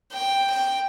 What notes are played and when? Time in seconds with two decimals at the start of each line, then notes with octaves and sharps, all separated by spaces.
0.13 G5
0.51 G5